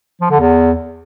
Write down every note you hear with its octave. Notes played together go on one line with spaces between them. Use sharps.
F3
D3
E2